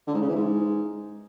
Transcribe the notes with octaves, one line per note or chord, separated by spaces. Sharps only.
D3
G#2
C#3
E3
G#2